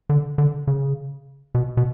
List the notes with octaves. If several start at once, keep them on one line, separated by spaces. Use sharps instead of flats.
D3
D3
C#3
B2
B2